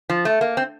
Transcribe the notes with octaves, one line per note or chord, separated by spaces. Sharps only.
F3
A3
A#3
C4